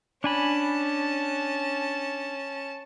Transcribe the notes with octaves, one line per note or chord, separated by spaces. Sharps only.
C#4 D4 G#5 A5 B5